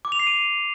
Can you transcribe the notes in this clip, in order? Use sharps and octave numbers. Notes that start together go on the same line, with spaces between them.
D6
F7
C7
D#7